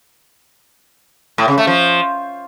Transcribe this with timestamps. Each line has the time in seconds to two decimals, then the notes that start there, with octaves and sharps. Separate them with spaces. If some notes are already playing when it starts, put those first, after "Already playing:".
1.38 A2
1.48 C#3
1.58 A3
1.67 F3